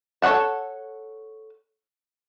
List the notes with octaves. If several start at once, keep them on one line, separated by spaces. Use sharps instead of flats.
A4 C#5 D#5 F#5 A5